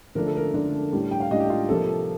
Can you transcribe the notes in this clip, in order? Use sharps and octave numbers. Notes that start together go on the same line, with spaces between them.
D3 F3 A3 D4 A#4
A4
A#4
D3 F3 A3 D4
A2 G3 D4
G5
F5
A2 G3 D4 D#5
G4
F4
C3 F3 A#3 A4